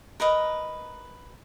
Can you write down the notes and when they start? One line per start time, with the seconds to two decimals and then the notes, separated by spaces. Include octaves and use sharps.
0.20 A#4 B4 D#5 A#5